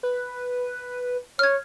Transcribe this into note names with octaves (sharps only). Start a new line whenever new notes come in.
B4
C#5 F6 G#6